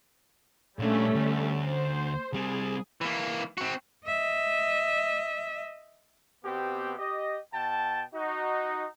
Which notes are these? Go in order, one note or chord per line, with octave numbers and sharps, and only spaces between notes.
A#2 G3 A3 C#4 D4
D2
C5
G3 C4 G#4
E3 A#3
C4 F#4
D#5 E5
B2 B3 C4 G4
G4 D#5
B2 G5 A5
D#4 F#4